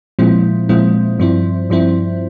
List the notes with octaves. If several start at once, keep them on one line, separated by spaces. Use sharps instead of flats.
A#2 F3 G#3 C4 E4
A#2 F3 G#3 C4 E4
G2 F3 C4 E4
G2 F3 C4 E4